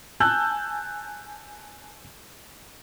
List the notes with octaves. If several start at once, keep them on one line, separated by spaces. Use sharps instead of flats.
G#5 A5 E6 F#6 G6